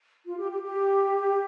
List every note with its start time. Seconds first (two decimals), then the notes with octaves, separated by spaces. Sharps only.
0.24 F4
0.37 G4
0.50 G4
0.62 G4